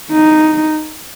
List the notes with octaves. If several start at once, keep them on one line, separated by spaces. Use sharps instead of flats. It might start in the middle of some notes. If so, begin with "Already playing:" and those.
D#4